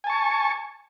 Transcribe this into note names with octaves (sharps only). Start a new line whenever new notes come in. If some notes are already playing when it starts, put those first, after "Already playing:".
G#5 A5 C#6